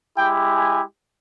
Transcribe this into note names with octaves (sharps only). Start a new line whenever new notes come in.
G#3 E4 G4 G5
G#5